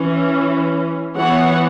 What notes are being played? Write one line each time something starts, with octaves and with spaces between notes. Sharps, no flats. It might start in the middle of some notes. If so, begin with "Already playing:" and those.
Already playing: E3 C#4
E3 B3 C#5 F#5